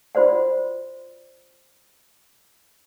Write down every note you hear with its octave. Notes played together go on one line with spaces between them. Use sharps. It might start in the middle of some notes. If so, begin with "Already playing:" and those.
F4 F#4 C5 D5 F#5